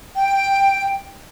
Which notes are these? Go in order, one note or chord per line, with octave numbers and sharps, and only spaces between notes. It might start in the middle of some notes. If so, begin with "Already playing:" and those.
G5